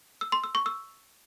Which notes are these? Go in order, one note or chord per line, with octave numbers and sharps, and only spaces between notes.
E6
C6
E6
C#6
E6